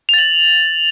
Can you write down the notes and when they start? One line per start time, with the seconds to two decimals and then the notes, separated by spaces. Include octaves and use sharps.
0.09 F7
0.14 A6
0.18 F#7